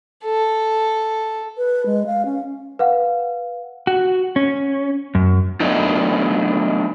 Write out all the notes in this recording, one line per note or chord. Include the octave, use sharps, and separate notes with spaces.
A4
B4
G#3
F5
C#4
B4 F5 F#5
F#4
C#4
F#2
F#3 A3 B3 D4 D#4